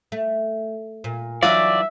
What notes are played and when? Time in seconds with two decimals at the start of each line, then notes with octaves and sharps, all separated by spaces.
0.12 A3
1.04 A#2
1.43 E3 F#3 D#4 F4 F#4 D5 E5 F5